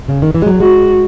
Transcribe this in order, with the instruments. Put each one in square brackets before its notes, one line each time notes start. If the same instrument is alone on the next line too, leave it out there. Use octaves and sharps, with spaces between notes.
[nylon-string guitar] C#3
D#3
E3
G#3
F#3
[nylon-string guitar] G#3 [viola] F#4